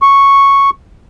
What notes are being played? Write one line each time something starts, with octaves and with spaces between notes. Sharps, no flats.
C#6